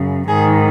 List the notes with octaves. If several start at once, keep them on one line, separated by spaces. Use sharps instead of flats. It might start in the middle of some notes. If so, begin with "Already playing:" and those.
Already playing: F#2 C#3
G#2 D#3 G#4